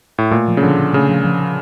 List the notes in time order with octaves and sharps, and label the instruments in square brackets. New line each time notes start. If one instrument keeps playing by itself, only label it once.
[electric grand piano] A2
[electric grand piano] A#2 [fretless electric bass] A3
[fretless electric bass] F3
[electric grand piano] C#3
[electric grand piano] D3 [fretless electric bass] F3
[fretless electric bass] D4
[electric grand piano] C#3 [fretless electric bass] A3
[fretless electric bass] F3
F3
D4